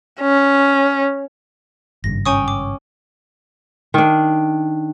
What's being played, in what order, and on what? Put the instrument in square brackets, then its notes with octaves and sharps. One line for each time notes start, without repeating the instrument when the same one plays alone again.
[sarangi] C#4
[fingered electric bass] G#1 G2 C#3 [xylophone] A#6
[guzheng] C#4 G5 [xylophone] G#5 C#6 D#6
[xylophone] D6
[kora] D#3 D4